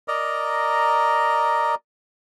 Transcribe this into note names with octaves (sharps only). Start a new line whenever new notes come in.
A#4 D5 D#5 A#5